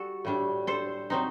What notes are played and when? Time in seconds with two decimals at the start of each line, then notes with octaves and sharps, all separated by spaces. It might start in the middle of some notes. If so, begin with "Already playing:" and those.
Already playing: G3 F#4 A4
0.25 A2 G3 D4
0.67 A4 C5
1.10 F#3 C4 D#4